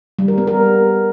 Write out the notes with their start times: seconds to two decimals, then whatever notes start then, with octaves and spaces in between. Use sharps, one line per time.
0.19 G3
0.28 A#4
0.38 B3
0.47 A#4